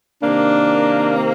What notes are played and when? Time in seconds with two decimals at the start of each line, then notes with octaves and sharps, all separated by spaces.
0.22 C3 D#3 A#3 D4
1.17 C4